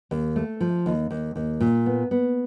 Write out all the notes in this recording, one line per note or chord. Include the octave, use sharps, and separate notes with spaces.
D#2
A3
F3
D#2
D#2
D#2
A#2
B3
B3